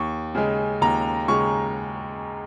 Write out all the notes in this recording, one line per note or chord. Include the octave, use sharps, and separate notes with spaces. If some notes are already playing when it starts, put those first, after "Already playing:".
Already playing: D#2 C#6
C#3 G#3
D#2 A#5
C#3 G#3 C#6